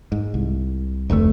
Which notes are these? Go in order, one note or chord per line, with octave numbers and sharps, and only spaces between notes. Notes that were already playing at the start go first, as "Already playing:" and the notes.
G#2
C2
F1 D2 A2 A3